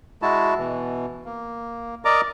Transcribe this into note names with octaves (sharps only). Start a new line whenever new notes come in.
G#3 E4 F#4 A5
B2 E3
A#3
A#4 D5 D#5 A#5 D6